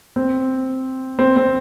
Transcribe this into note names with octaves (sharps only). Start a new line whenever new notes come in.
C4
C4
C4